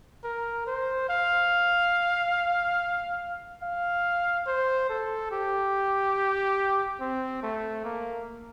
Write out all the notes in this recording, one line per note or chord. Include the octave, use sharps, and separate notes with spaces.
A#4
C5
F5
F5
C5
A4
G4
C4
A3
A#3